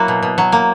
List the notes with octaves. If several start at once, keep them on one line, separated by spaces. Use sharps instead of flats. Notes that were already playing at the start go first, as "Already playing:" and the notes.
Already playing: F#3 A#3 E4 F#4
B2
B2
F#3
A#3